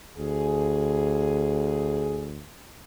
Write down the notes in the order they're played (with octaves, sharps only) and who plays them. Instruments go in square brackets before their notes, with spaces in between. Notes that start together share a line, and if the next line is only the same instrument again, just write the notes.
[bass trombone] D2 [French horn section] G#4